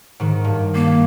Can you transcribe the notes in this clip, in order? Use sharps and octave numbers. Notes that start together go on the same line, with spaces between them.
G#2 D#3
G2
A#3